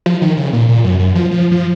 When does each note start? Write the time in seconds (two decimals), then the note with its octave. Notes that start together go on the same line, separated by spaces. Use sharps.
0.06 F3
0.22 D#3
0.37 C#3
0.53 A#2
0.69 A#2
0.84 F#2
0.99 F#2
1.15 F3
1.31 F3
1.52 F3